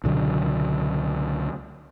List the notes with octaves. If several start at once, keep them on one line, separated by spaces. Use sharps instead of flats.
C#2 B2 D3 F#3